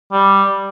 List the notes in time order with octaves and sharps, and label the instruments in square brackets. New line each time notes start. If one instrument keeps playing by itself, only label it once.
[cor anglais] G3